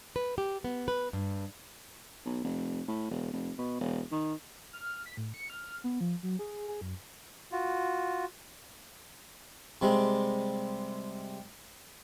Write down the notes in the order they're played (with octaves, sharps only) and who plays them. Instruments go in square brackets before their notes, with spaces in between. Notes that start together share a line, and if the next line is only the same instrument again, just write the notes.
[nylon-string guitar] B4
G4
B3
B4
G2
[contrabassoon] B1
F1
A2
E1
F1
B2
E1
D#3
[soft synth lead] F6
B6
A2
C#7
F6
B3
F3
F#3
G#4
G#4
F#2
[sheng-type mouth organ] F4 F#4
[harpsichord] C3 G3 G#3